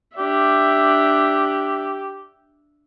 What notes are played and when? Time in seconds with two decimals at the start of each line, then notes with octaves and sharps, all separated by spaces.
0.18 D4 G4 E5